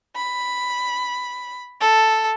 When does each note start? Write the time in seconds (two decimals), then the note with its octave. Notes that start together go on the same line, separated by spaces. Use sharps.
0.15 B5
1.80 A4